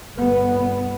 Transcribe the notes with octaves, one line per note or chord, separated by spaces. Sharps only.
G1 B3